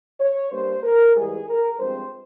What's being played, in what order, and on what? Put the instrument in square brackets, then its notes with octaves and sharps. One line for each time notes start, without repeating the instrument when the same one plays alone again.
[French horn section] C#5
G2 G3 A#3 C5
A#4
G#2 E3 G3 G#4
A#4
G2 F3 G#3 C4 C5